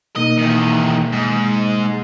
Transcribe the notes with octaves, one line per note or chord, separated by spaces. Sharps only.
B2 A#3 D#4 D#5
E2 D#3
G#2